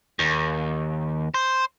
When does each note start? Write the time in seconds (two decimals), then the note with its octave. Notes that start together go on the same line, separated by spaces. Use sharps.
0.19 D#2
1.34 C5